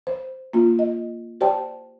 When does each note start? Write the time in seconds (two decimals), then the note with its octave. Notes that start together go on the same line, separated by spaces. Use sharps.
0.07 C5
0.53 A#3 F4
0.79 D#5
1.41 G4 C5 D5 G5 A5